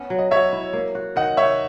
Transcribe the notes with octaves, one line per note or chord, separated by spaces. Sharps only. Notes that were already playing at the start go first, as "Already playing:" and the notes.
Already playing: B3 C#4
F#3
D#5
F#3 C#5 E5
E4
A#3
F#4
D#3 D#5 F#5
D#4 C#5 E5